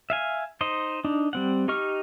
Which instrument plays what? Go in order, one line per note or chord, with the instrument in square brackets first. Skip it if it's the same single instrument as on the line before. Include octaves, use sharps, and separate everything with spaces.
[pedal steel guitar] E5 F5 G#5
D#4 C5 D#5
D4 D#4
G3 C4 F#5
D#4 G4 D#5 C#6 F6